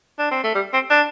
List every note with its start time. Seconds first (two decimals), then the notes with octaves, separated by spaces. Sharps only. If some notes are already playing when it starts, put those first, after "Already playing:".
0.19 D4
0.31 C4
0.43 A3
0.55 G3
0.73 C4
0.90 D4